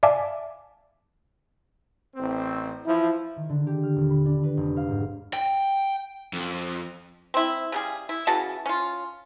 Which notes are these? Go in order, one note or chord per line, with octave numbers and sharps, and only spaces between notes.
D5 E5 F5 G#5 A5 D6
A1 C4
E3 F3 E4
D#3
D3
G4
F6
D#1
B5
D4
B4
F1
F5
G#2
G5
F2
C4 E4
C#3 G3 G#4
E4
C#3 E3 F#4 A5
C#4 F4